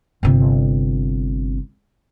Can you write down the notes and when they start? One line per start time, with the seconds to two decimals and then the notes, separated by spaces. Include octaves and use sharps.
0.23 G1 C3